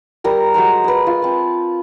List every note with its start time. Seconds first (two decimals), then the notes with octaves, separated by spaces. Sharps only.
0.24 G3 A#4 A#5
0.54 F#3 G#3 C5 A#5
0.84 G#4 B4
1.07 F4
1.22 C4 A5